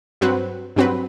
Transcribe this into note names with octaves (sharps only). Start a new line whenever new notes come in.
G2 F#3 C4 F#4 B4
G2 F#3 C4 F#4 B4